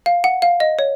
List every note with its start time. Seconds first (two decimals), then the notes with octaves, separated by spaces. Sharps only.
0.06 F5
0.24 F#5
0.42 F5
0.60 D#5
0.79 C#5